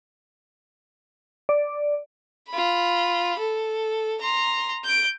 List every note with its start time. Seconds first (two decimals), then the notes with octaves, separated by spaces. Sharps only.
1.49 D5
2.50 F4 B5
3.39 A4
4.21 A#5 C6
4.85 G6 D7